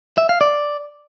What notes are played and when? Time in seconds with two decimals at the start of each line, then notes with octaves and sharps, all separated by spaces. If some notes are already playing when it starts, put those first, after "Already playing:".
0.18 E5
0.29 F5
0.41 D5